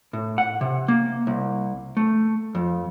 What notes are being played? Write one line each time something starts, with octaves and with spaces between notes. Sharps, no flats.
A2
F#5
C3
A#3
C2
A3
F2